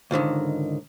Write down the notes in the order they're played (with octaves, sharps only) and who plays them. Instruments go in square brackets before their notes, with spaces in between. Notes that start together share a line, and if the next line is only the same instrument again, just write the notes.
[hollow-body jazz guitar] C#2 G#2 D3 D#3